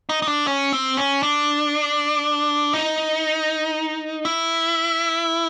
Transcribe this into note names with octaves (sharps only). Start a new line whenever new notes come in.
D#4
D#4
D4
C#4
C4
C#4
D4
D#4
E4